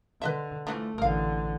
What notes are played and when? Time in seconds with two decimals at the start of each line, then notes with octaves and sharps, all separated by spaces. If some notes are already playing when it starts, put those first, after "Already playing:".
0.22 D3 B4 D#5 E5
0.67 D3 E3 F3 A3
0.98 A1 D3 A#4 F5